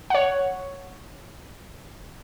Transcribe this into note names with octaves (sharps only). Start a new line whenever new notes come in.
C#5 F#5